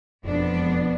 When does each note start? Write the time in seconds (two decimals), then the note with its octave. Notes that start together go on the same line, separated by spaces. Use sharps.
0.24 E1 F2 B3 D4